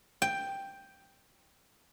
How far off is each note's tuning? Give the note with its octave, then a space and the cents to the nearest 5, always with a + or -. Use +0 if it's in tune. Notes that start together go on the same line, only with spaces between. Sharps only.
G5 +5